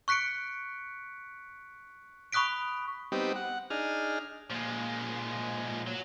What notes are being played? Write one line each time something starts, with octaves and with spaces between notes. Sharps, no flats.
C#6 F#6 B6 C#7 D7
B5 C#6 D#6 F#6 B6 D7
G3 B3 C4 D#4 G4
F#5
D4 D#4 G#4 F6
A#2 F3 G#3
F#3